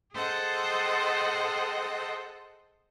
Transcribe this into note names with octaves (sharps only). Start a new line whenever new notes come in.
G#4 A4 C5 D#5 F#5 G5